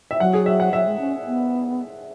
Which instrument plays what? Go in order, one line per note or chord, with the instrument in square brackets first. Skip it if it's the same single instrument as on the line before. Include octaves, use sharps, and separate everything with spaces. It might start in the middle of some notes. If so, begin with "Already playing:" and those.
[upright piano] E5
[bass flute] F#3 [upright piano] F#5
[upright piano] G#4
E5
F#5
[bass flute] F#3 [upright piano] E5
[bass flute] G#3
C#4
B3